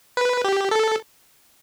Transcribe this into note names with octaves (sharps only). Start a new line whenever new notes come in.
B4
G4
A4